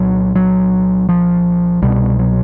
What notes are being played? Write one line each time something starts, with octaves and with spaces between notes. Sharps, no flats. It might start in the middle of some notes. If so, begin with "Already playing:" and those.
Already playing: C2 A#2 F#3
F#3
F3
C2 B2 G3
F#3